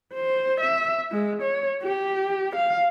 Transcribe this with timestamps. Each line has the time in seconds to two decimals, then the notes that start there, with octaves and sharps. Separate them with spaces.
0.14 C5
0.61 E5
1.12 G#3
1.42 C#5
1.84 G4
2.56 F5